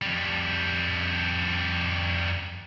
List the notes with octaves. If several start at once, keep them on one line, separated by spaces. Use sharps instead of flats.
F2 G3